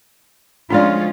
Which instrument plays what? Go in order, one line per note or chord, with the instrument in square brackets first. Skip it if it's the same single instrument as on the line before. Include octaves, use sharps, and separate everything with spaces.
[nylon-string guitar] D2 F3 F5 [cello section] G#3 C#4 F4 [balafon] D4 D5